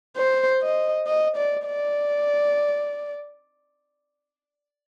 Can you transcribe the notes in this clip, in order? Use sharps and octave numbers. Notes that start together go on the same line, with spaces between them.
C5
D#5
D#5
D5
D5